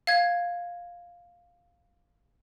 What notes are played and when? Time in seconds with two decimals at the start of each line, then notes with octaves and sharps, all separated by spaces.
0.07 F5 G#6